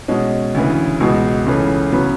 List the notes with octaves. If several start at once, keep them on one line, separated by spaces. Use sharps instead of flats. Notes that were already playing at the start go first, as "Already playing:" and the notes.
B2 G#3 C#4
D2 C#3 E3
C#2 B2 G#3
C#2 C#3 E3 A3 C#4
C#3 F#3 B3